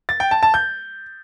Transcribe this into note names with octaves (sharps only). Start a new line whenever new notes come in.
A6
G5
A5
A5
G6